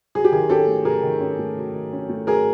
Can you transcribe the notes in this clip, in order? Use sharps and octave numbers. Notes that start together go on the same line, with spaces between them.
F#3 G#4
G4
D#3 G#4
C#4 G4 A4
A3
F#3 G#4 A#4
D#3
C#4
A3
F#3
D#3
C#4
A3
F#3 G#4 A#4